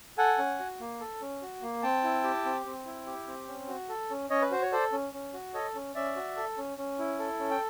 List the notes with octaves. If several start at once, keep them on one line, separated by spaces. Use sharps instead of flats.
A4 F#5 G#5
C#4
F#4
A#3
A4
C#4
F#4
A#3
C4 G5 A5
E4
G4
C4
C4
E4
G4
C4
C#4
F#4
A4
C#4
C#4 C#5 D#5
B4
F#4 C5
C#5
A4 C5 D5
C#4
C#4
F#4
A4 C#5 D#5
C#4
C#4 D5 E5
F#4
A4
C#4
C#4
E4
A4
C#4
G5